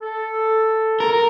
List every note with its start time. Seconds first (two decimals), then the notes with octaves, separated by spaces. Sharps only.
0.02 A4
1.00 A#4